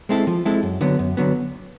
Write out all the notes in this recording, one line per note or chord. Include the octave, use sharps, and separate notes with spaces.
G#3 C4 E4 A4
F3
G#3 C4 E4 A4
F#2
D3 F#3 B3
F#2
D3 F#3 B3